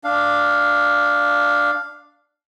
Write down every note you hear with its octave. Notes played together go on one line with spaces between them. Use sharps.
D4 F5